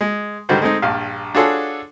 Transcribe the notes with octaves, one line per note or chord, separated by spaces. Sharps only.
G#3
G#2 D3 D#3 G3 F#4 C5
G#3 A3 C4 D#4
A#1 G2 F5
D4 F4 F#4 G#4 A4 C#5